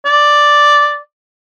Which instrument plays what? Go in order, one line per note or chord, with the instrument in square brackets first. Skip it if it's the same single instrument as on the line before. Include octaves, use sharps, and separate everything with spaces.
[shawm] D5